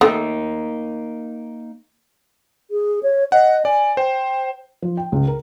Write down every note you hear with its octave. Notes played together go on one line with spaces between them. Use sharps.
D#3 A3 A#3 D#4
G#4
C#5
D#5 F#5
D5 G#5
C5 G5
F3
G5
C#2
A#4